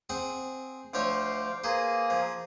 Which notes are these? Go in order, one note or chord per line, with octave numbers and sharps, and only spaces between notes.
C4 G#4 F#5
D2 F3 C5 C#5 F5 D6
A#3 G#4 B4 C5
F3